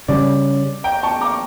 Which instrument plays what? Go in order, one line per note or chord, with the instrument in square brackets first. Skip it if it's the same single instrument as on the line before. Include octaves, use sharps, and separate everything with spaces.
[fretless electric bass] C#3 G3 C#4 [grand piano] D5
[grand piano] G5 A#5
A5 C#6
A#5 D6